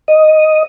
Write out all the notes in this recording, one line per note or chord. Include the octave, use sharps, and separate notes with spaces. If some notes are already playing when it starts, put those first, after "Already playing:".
D#5